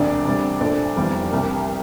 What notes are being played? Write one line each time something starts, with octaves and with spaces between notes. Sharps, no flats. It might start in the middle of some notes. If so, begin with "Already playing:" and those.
Already playing: E1 D2 C3 D4 D5
D2 C3 G3
C2 A#2 A3 C4 D4 D5
F1 E2 E3 G3 C4
C2 C3 G3 A#3